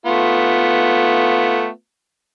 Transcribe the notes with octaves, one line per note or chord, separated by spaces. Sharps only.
A3 B3 F4